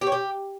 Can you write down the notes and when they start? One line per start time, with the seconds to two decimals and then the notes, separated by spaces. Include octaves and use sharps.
0.01 G4
0.07 C#5
0.12 G4